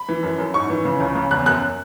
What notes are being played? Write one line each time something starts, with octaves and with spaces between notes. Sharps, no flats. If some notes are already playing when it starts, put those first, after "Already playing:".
Already playing: B5
E3
F#2
F#2
G#2 C#6
E3
C#3
C#2
C#3
E2 F#6
F#2 F#6